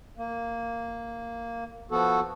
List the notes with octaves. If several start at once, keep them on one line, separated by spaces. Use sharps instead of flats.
A#3
F3 B3 F#4 A4